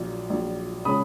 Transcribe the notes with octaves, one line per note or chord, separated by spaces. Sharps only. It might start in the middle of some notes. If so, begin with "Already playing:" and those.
Already playing: A#1 A#2 F#3
A#1 A#2 F#3
C#3 G#3 C#4 B5 D#6